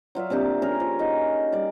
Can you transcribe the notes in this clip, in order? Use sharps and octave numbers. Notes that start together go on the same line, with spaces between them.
F#3 F4 D5 E5
C3 A#3 D4 G4
C#4 G#4 A#4
F3
D#4 F#4 D#5
G3 D5